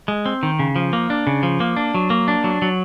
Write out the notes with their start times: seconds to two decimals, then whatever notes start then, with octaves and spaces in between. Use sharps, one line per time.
0.08 G#3
0.26 C4
0.43 D#3
0.59 C#3
0.76 F3
0.93 A#3
1.10 D4
1.27 C#3
1.43 F3
1.60 A#3
1.77 D4
1.94 F#3
2.10 A#3
2.28 D4
2.44 F#3
2.62 F#3